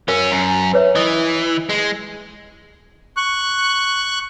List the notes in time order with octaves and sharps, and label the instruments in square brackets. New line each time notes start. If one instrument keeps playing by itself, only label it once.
[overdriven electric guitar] F#3 C#4 [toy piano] A#4 F5
[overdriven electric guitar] F#2
[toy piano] B4 C#5 E5
[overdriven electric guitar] E3 [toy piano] D#5 D#6
[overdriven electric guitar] G#3
[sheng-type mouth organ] C#6 F#6